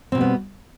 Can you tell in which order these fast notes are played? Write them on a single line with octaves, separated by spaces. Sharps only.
C4 B2 G3 B3